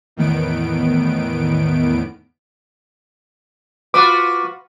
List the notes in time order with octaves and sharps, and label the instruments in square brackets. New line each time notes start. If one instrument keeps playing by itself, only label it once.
[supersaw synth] E2 A2 D#3 B3 D7
[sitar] F4 F#4 B4 [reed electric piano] D6